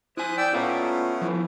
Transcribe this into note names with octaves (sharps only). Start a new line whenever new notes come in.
E4 C5 G#5 D#6 F#6
D5 G5 E6
A3 B3 C#4 F4 F5 A#5
F3 E4